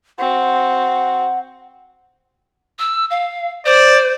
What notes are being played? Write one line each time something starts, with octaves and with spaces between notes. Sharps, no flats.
C4 F#4 F#5
E6
F5
C5 D5